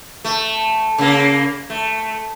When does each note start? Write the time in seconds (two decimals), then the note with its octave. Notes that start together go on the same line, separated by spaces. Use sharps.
0.25 A3
0.98 C#3 A#3
1.70 A3